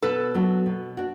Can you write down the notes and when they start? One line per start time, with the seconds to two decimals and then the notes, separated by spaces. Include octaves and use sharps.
0.02 B2 A4 B4
0.34 F#3 B3 D4 F#4
0.66 B2
0.97 D4 F#4